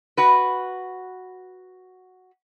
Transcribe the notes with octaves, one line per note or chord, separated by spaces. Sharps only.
F#4 B4